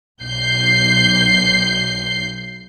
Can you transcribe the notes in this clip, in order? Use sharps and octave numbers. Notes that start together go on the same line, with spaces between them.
B1 G6 C7